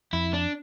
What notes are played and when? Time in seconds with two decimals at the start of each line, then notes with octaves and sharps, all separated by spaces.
0.13 F2 E4
0.33 D4